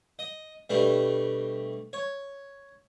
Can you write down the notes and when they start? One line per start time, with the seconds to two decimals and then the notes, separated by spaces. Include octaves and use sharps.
0.19 D#5
0.70 B2 G3 A3 D4
1.93 C#5